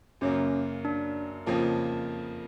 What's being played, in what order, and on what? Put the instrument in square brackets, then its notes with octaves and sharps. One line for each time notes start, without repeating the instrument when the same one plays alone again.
[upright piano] F#2 C#3 F#3 A#3 [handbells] C#4
[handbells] D4
[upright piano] F2 C#3 F3 A#3